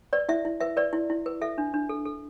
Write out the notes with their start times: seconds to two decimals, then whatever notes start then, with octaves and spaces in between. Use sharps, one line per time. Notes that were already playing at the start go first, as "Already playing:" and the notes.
0.13 B4 D5
0.29 E4 E5
0.45 E4
0.61 B4 E5
0.77 B4 D5
0.93 E4
1.10 E4
1.26 B4
1.41 A4 E5
1.58 D4
1.74 D4
1.89 A4
2.05 A4